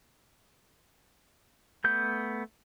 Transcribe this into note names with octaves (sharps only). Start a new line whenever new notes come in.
A3 B3 G6